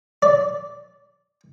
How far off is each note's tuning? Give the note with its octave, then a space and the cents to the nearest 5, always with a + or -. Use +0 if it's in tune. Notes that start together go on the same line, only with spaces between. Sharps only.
D5 -10